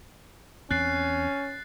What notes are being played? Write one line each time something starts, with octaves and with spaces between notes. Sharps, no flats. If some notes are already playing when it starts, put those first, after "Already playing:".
E2 C4 C#4 F#6 A6 C7